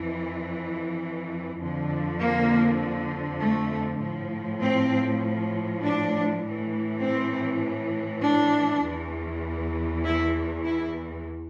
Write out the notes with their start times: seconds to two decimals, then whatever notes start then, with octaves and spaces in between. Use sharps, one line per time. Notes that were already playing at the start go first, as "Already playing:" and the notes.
Already playing: F2 E3
1.59 F2 D3 F3
2.20 A#3
3.40 A3
4.01 A2 F3
4.60 C4
5.82 D4
6.41 A2 E3
7.01 C4
8.22 D4
8.83 E2 E3
10.04 E4
10.64 E4